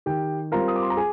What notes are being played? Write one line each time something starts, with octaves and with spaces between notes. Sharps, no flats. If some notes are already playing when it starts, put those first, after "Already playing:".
D#3 G4 G5
G3 C4 F4 A#4 A#5
D#6
D6
C6
A#5
G#4 G#5